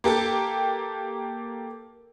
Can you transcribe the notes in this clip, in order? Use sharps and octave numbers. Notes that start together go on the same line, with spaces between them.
A#3 G4 A4 G5